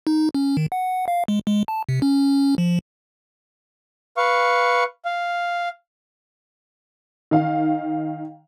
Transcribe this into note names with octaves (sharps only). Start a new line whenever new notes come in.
D#4
C#4
D#3
F#5
F5
G#3
G#3
A5
C3
C#4
F3
B4 F5 C#6
F5
D#3 F5